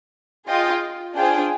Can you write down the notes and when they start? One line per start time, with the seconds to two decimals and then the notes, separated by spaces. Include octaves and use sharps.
0.46 F4 G#4 D#5 G5
1.15 D4 F4 G#4 C5 G5